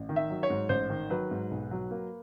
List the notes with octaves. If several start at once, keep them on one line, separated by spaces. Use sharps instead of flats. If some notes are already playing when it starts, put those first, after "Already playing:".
Already playing: A1
D#3
E5
F#3
C#5
G#2
A1 C5
D#3
F#3 B4
G#2
B1
F#3
A#3